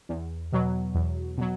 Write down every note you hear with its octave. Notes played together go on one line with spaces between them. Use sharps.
E2
B2 F#3
E2
B2 F#3